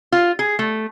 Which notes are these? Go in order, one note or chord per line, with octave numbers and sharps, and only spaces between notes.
F4
G#4
A3